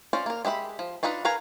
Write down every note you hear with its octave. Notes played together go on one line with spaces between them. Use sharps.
C#4 F4 C5 D5
A#3 A#4
G#3 G4 E5 B5
F3
D4 D#4 F4 B4 D#5
A#4 B4 F5 G#5 A#5